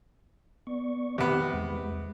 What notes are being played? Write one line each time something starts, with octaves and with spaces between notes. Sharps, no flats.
B3 D5 C#6
C3 D#3 E3 B3 G4
E2 G#3